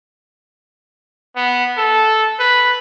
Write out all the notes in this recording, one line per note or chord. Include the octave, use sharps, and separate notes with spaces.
B3
A4
B4